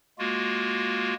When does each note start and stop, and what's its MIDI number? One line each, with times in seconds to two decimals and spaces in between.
0.19 1.14 56
0.19 1.14 58
0.19 1.14 65
0.19 1.14 66